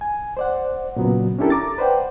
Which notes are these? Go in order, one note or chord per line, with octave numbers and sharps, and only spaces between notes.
G#5
C5 D5 F#5
A#2 C#3 F#3 B3
C#4 D4 E4 G4 A4 A#4
A#5 D6 A6
B4 C5 D5 F#5 G5